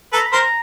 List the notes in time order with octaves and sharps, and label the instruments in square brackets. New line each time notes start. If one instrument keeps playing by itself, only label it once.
[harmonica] A4 B4 [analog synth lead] A#5
[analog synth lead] B5
[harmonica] A#4 C5
[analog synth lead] A#5